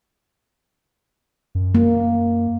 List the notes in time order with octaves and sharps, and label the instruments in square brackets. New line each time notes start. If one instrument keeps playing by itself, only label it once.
[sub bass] F#2
[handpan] A#3